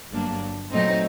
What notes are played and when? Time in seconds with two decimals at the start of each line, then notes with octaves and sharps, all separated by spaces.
0.11 G1 G2 F#3 A#3 D4
0.72 A#2 F#3 A3 C4 D#4